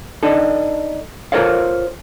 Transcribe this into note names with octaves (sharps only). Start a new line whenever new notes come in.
D4 D#4 A4
F4 A4 A#4 C5 C#5 F5